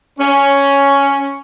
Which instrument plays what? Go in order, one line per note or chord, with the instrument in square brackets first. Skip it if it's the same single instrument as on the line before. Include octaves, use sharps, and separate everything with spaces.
[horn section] C#4